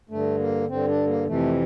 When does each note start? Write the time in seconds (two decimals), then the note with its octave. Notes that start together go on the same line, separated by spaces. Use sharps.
0.10 G2 D3 A3
0.39 A#3
0.68 G2 D3 C4
0.88 D4
1.07 A#3
1.26 F2 C3 E3 A3